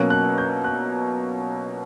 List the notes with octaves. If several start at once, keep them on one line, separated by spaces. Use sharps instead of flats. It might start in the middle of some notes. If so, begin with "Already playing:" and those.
Already playing: B2 F#3 A#3 C#4 F#6
F#6
G6
F#6